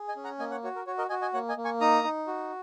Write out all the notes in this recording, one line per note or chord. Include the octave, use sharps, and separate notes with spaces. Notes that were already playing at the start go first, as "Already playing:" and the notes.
Already playing: G#4
D#5 G#5
C#4
F#5 A#5
A#3 D#5 G#5
C#5 F#5
F#4 C#5
A#4
F#4 C#5
A#4 D#5
F#4 D#5 G#5
D#5 G#5
A#3 C#5 F#5
D#5 G#5
A#3
G#5 C#6
D#4 A#5 D#6
D#4
F#4